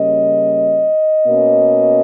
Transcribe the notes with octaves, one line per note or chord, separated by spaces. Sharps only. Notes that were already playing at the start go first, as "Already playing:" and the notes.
Already playing: C#3 G3 A#3 C#4 D#5
B2 A#3 C#4